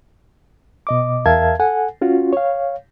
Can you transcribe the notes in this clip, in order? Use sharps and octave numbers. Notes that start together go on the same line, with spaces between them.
B2 D#5 D6
E2 A#4 E5 F5 A5 G#6
A4 F#5 G#5
C#4 F4 F#4
C#5 F5